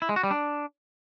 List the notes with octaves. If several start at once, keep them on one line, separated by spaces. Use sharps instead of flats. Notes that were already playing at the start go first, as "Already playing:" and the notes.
E4
G#3
F#4
G3
D4